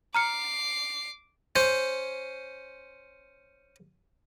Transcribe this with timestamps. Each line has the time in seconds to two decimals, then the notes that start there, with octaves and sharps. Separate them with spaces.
0.15 A#5 D6 F6 C7 C#7
1.56 C#4 C5